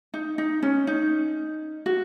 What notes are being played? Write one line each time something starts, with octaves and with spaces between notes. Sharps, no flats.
D#4
D#4
C#4
D#4
F#4